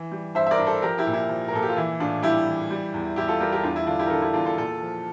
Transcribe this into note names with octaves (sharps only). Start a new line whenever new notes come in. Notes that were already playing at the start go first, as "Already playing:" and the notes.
Already playing: E3
G3
G2 C5 E5
E5
A#4 D5
G2
A4 C5
F3 G4 A#4
E4 G4
A#2
E4
F3
A#4
A#2 A4
G4
F4
E3 E4
A2 D4 F4
G3 E4 G4
E3
G3
E2
E2 E4 G4
F4 A4
G3 G4 A#4
G4 A#4
E2 D4 F4
E4
D3 D4 F4
E4 G4
A#4
D3 F4 A4
E4 G4
E2 D4 F4
F4 A4
A#2 F4 A4
F3